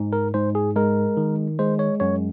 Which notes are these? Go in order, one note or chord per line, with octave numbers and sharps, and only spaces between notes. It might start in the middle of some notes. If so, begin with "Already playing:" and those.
Already playing: G#2
A#4
G#2 C5
G#4
G#3 A#4
D#3
G#3 C5
C#5
F#2 C#5